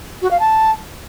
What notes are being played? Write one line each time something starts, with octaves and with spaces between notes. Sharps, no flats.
F#4
F5
A5